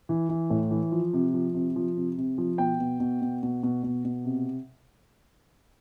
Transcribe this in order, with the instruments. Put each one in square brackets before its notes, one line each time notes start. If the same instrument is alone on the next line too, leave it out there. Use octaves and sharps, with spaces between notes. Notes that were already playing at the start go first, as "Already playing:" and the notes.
[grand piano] E3
E3
A2
E3
F3
C3
F3
C3
F3
C3
C3
F3
B2 G5
B2
B2
B2
B2
B2
B2
B2
C3